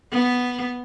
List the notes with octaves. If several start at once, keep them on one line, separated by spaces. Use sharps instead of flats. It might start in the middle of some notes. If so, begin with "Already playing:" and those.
B3